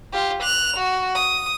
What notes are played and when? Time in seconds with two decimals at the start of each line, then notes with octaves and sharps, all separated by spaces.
0.13 F4 G4
0.42 F#6 F7
0.77 F#4
1.15 D#6